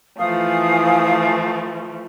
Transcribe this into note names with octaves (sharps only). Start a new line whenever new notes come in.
E3 F3 A3 F5 G#5 D#6